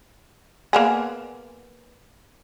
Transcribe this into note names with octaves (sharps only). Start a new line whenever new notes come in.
A#3 B3 G#4